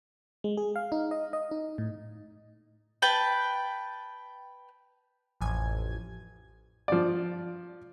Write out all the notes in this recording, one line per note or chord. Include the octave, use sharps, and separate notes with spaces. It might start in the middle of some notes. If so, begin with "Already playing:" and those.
G#3
G#4
F5
D#4
D#5
D#5
D#4
A2
B4 G5 A5
A1 F2 G#5 G#6
F3 D5